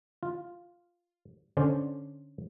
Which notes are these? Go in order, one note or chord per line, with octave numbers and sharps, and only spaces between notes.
F4
D3 C#4 C5 D5